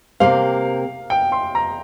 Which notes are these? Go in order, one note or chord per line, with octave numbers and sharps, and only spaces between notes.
C3 A#3 G4 C5 F5
G5
C6
A#5